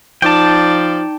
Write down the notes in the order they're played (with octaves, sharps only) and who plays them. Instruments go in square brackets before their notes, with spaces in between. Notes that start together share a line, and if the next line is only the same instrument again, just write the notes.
[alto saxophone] F3 [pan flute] D#4 [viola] D5 [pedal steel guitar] G5 A5